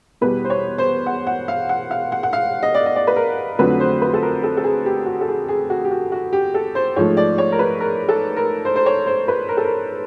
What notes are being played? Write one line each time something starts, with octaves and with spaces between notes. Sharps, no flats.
E2 B2 G3 B4
C5
C#5
C5
F#5
F#5
F5
F#5
F5
F#5
F#5
F5
D#5
D5
D#5
D5
B4
A#4
F2 D3 F#3 A3 B4
C5
B4
A4
A#4
A4
A4
G#4
G4
F#4
A4
G#4
G#4
F#4
G4
F#4
F#4
G4
A4
C5
G#2 F3 A3 C#5
D5
C#5
A#4
B4
A#4
A4
A#4
C5
C5
C#5
C5
B4
A#4
A4
A#4